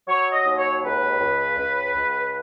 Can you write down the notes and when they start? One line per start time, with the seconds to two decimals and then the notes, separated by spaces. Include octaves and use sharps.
0.08 F#3 C#5
0.32 D#5
0.45 D#2
0.58 C#5
0.83 C#2 B4
1.20 C#2
1.58 C#2
1.96 C#2